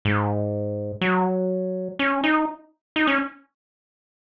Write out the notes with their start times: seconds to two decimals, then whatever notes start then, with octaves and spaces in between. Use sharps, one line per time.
0.05 G#2
1.01 F#3
1.99 C#4
2.24 D#4
2.96 D#4
3.07 C#4